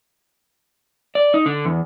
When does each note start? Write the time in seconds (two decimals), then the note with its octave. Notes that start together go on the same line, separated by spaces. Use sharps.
1.15 D5
1.34 D#4
1.46 D3
1.65 E2